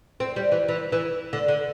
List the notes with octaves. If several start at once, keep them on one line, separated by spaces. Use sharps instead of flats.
C4
G3
E3
E3
E3
D3
D3